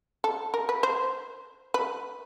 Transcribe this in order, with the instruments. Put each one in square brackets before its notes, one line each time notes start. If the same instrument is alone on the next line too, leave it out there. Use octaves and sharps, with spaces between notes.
[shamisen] A4
A#4
B4
C5
B4